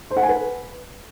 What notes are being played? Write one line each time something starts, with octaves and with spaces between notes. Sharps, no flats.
C5
F#5
G#5
B4